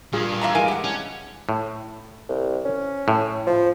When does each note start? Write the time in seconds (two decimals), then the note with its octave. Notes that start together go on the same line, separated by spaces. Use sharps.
0.13 G2 A#2 G#4 F5
0.41 E3 A#3 E5 A#5
0.55 E3 G#3 A#4 F5 G#5
0.68 G4 F#5
0.84 C#4 D4
1.49 A2
2.29 C2
2.65 C#4
3.08 A2
3.47 F3